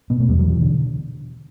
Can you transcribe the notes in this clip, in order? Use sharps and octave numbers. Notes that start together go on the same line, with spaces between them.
B2 B3
A3
E2 G3
F#3
B2 E3
D3